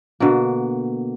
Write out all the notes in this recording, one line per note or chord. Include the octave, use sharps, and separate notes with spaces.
B2 D3 A#3